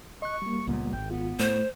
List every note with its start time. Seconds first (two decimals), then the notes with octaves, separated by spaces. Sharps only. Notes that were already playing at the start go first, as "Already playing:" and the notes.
0.22 D#5 C#6 F#6
0.42 G3 A#3
0.67 C#2 A#2 B3
0.93 G#1 G5
1.11 B3 F4
1.39 A2 A3 C5